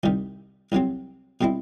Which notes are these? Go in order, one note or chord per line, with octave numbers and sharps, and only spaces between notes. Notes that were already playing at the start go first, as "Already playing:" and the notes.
C2 C3 D#3 G3
C2 C3 F#3 C4
B2 G3 C4 E4